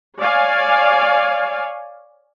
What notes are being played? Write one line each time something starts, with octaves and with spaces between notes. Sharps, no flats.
C#5 D5 F5 G#5